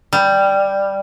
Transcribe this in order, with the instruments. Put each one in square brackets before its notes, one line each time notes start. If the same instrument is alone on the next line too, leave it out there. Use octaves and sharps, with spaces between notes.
[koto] G3